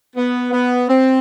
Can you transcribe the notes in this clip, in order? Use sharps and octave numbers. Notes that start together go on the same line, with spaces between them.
B3
B3
C4